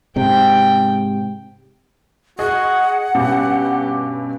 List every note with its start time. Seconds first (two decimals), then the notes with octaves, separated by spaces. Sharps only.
0.16 G#2 C3 G5
2.39 F#4 G#4 D#5 F#5
3.15 G2 B2 C#4 G4